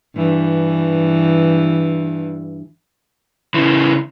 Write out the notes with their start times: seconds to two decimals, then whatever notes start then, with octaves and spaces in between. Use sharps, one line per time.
0.16 G2 E3
3.54 C#3 E3